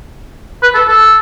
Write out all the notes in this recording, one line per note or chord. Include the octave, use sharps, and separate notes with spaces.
B4
A4
A4